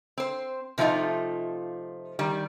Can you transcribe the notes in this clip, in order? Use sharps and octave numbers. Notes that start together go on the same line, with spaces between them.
C4 C5
C3 F3 F#3 A3 D#4 F4
D#3 G3